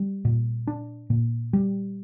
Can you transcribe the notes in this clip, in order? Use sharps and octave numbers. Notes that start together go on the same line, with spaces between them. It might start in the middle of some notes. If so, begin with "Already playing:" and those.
Already playing: G3
A#2
D4
A#2
G3